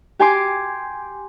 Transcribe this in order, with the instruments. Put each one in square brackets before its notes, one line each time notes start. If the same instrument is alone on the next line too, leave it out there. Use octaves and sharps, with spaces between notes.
[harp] G4 G5 G#5 C6 D6